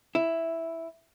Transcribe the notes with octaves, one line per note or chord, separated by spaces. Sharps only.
E4